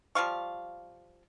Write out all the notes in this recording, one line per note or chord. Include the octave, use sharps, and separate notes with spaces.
F3 G3 F5 C#6